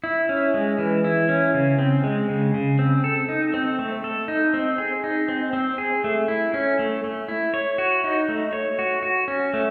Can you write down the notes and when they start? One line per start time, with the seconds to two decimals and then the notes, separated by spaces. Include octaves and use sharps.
0.04 E4
0.29 C#4
0.54 G#3
0.78 E3
1.04 E4
1.29 C#4
1.54 C#3
1.78 C4
2.04 G#3
2.29 C#3
2.54 C#3
2.79 C4
3.04 A4
3.29 D#4
3.54 C4
3.79 A3
4.04 A4
4.28 D#4
4.54 C4
4.78 G#4
5.04 D#4
5.28 C4
5.53 C4
5.78 G#4
6.04 A3
6.28 E4
6.54 C#4
6.79 A3
7.04 A3
7.28 E4
7.54 C#5
7.78 F#4
8.04 D#4
8.29 A3
8.53 C#5
8.79 F#4
9.03 F#4
9.28 C#4
9.54 A3